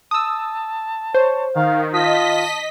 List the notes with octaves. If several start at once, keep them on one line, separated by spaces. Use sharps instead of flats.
A5 D#6 E6
C5 C#5
D#3 F5
F4 D#5 A5 B6